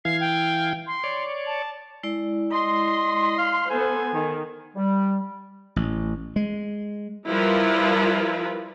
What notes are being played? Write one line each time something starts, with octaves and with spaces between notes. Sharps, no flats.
E3 F5 G#6 C7
G5
C6
C#5 D5
A5
G#3 E4 D5
D#5 C6
F5
B3 A4 C5 G#5
D#3
G3
A1
G#3
F3 G3 E4 F4 A#4 B4